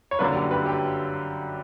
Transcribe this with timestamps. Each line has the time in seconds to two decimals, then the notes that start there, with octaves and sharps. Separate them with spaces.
0.11 C#5
0.19 G1 F#2 D3 A#3 B4 D5
0.35 G4
0.50 G4 B4
0.66 G4